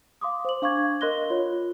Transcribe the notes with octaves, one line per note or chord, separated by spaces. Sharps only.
F5 C6 D6 D#6
C5 F#7
D4 F5 C#6 D6 G#6
A#4 D#5 C6 F#6 A#6 G7
F4 C#5